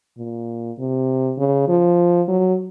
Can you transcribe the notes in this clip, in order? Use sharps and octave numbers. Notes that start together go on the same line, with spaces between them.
A#2
C3
C#3
F3
F#3